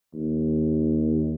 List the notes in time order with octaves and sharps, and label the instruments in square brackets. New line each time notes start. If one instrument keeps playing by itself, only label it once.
[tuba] D#2